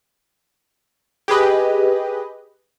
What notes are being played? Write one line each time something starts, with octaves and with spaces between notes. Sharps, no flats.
G4 G#4 B4 D#5